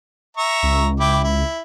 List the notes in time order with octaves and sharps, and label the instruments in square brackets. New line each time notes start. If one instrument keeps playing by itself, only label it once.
[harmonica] E5 A#5 C#6
[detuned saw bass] C#2
[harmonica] E4 G5 D6
E4